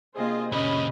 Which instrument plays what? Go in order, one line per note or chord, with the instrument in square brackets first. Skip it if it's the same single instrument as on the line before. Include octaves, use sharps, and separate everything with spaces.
[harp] C3 A#3 D4 [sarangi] F4 [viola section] G#4 C5 D#5
[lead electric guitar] A#2 C#3 [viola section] C#4 B5 [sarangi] D#5